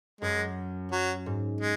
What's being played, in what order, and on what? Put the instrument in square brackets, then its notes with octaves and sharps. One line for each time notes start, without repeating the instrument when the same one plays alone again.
[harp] F#2 [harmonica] G#3
[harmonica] F#3
[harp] G#2
[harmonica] G#3